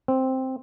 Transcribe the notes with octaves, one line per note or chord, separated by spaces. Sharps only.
C4